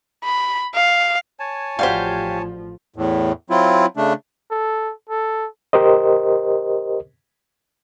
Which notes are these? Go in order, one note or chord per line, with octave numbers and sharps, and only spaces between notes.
B5
F5
C#5 G#5 A5
A1 F3 G3 F#4 G4 C5 F5
E2 A2
F#3 C4 E4 F4
C#3 A3 D4
A4
A4
G4 A#4 C5 D#5